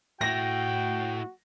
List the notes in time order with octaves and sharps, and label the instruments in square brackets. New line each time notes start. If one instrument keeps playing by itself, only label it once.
[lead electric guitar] A2 E4 [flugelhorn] F#4 [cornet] G5 [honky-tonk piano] A#6